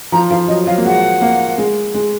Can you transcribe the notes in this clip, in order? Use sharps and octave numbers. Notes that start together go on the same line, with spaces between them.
F3 A#5
F3 F5
F#3 D#5
F#3 F5
A#3
G#3 F#5
A#3
G#3
G#3